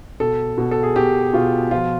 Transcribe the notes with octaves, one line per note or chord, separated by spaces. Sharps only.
B2 A4
B2
A4
G#4
B2 G4
B2 F4
F3 F4